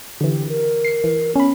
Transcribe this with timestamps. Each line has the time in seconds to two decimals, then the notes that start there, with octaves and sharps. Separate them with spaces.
0.21 D3 E3 G4
0.48 A#4
0.85 C7 C#7
1.04 E3
1.36 B3 C#4 B5